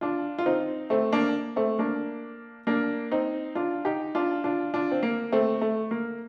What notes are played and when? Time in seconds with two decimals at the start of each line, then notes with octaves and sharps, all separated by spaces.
0.01 D4 F4
0.38 F4
0.46 C4 D#4
0.90 A3 C4
1.12 A#3 D4
1.56 A3 C4
1.79 A#3 D4
2.67 A#3 D4
3.11 C4 D#4
3.55 D4 F4
3.85 D#4 G4
4.15 D4 F4
4.44 D4 F4
4.74 D4 F4
4.91 C4
5.03 A#3
5.32 A3 C4
5.61 A3
5.91 A#3